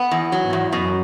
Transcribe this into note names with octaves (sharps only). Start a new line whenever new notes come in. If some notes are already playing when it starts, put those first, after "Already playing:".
Already playing: B3
E2
F#3
G#2
E2
F#2 B2